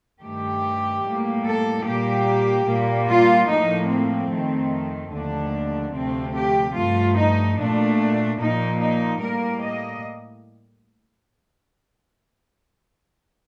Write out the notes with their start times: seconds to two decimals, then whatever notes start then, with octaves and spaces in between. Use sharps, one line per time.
0.22 G2 D#3 A3 G4
1.04 A2 G3 A#3
1.45 A4
1.85 A#2 G3 A#3 G4
2.68 A#2 G3 A#3
3.09 F4
3.50 A2 F3 A#3 D#4
3.90 C4
4.31 F2 D#3 A3
5.12 D#2 D3 F3 A3 D4
5.95 D2 C3 F3 A3 C4
6.36 G4
6.76 G2 F3 A3 F4
7.17 D#4
7.58 A#2 A3 D4
8.40 A#2 F3 A#3 D#4
8.81 D#4
9.22 A2 G3 A#3 A#4
9.63 D#5